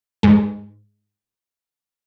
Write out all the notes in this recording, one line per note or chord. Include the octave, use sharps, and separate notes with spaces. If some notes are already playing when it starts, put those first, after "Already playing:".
G#2 G#3